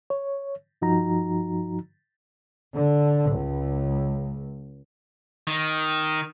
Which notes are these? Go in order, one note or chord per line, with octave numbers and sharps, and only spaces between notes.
C#5
G2 F3 D#4 F#4 A#5
D3
C#2
D#3